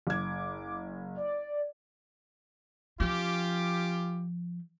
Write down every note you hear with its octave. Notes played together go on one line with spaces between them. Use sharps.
F#1 D6 G#6
D5
F3 C#4 F4 G4